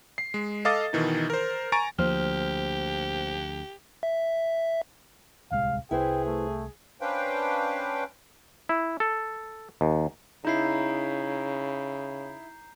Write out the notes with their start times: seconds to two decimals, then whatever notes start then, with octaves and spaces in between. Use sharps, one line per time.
0.18 C7
0.34 G#3
0.65 A4 D#5 F5 D6 D#6 A6
0.93 B2 D#3 E3 D#4
1.30 A#4 C5
1.72 G#5 A#5 C#6 A6 D7
1.99 D2 F3 A#3 G4 C5 F6
4.03 E5
5.51 D1 C2 G#3 F5
5.91 C2 E4 G#4 B4 C5 G5
6.25 A3
7.01 C#4 D4 B4 C5 F5 G5
8.69 E4
9.00 A4
9.81 D#2
10.45 C#3 D#4 E4 A#5 G6 C7